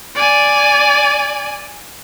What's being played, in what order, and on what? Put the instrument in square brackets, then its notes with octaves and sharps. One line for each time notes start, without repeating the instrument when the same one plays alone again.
[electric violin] D5 G#5